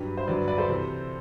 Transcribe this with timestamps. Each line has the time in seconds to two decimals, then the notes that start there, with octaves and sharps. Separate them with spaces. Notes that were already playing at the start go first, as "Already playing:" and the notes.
Already playing: G2 F#3 G4 B4
0.17 C5
0.27 G2 D3 F#3 B4 D5
0.48 B4 D5
0.58 A4 C5
0.69 C3 E3